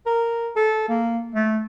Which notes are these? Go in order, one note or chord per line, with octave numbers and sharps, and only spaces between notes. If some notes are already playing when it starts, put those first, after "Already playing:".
A#4
A4
A#3
A3